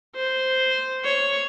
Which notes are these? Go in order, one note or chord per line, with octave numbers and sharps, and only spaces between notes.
C5
C#5